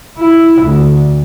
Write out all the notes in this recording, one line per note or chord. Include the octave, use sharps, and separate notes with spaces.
E4
D2